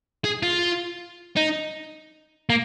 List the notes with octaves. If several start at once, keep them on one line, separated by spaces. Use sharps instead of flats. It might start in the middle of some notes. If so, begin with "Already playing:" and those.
G#4
F4
D#4
A#3